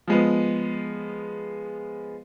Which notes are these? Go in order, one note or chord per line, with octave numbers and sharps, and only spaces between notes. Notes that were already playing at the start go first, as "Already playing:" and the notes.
F3 G#3 B3